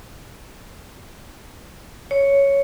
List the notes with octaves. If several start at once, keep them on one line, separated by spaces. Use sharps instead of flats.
C#5